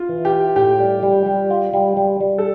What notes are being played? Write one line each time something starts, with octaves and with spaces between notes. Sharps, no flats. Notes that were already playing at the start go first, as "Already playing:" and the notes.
Already playing: E4 F4
E3
G4
E4
A2 G4
G3
G3
G3
F4
G3
G3
G3
A4